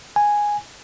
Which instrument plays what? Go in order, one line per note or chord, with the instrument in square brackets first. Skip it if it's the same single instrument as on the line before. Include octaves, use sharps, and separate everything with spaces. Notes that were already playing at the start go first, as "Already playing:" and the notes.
[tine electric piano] G#5